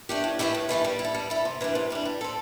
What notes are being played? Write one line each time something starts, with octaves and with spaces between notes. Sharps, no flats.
A3 D4 G4
A2
E3 A3 E4 G4
A2
E3 A3 E4 G4
G3
E4
A4
G3
E4 A4
C3
E3 G3 D4
C3
E3 G3 D4
G3
C4 A4